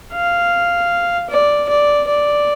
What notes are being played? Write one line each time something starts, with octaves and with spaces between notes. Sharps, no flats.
F5
D5
D5
D5